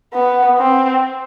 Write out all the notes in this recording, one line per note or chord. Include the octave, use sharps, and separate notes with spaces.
B3
C4